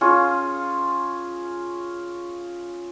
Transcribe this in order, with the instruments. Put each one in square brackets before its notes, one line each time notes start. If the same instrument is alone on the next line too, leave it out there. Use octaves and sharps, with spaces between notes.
[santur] C#4 F4 G#4